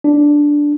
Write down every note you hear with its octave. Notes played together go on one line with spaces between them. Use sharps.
D4